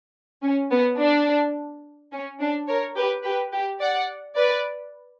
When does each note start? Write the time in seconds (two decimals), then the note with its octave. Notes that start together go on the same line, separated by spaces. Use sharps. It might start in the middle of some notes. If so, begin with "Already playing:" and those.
0.43 C#4
0.71 B3
0.99 D4
2.12 C#4
2.41 D4
2.68 A#4 C#5
2.96 G4 B4
3.24 G4 B4
3.53 G4
3.81 D5 F#5
4.36 B4 D5